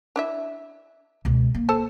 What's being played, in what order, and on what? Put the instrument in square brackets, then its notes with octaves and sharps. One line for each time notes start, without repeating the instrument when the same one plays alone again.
[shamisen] D4 E4 E5
[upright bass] C#2 B2
A#3
[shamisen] A4 C5 A5